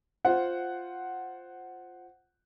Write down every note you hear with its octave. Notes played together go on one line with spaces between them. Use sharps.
F4 C5 F#5